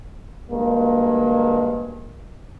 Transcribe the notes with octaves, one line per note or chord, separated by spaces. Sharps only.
D2 G2 G#3 A#3